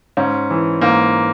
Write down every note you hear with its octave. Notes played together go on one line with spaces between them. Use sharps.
G#2 C#4
E3
G#2 A#3